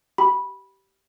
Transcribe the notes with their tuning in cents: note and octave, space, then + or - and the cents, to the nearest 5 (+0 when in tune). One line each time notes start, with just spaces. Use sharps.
G4 -20 G5 +0 B5 -10